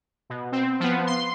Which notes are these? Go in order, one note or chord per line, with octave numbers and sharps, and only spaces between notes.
B2
C4
F3 B3
C6